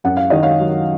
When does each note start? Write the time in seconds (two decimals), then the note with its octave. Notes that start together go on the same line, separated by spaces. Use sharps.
0.04 F#2 F#5
0.17 F5
0.30 D#3 D#5
0.42 C#5 F5
0.60 F#3